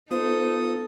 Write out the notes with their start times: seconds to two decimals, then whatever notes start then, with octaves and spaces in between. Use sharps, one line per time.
0.11 B3 D#4 F4 A4 C5 D#6